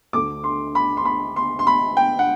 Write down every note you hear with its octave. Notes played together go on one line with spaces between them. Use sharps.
D2 D3 A3 D6
C6
B5
C6
B5
C6
C6
B5
G5
F#5